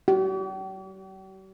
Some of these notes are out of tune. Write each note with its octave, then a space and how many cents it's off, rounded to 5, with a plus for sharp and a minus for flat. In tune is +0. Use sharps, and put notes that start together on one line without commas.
G4 -45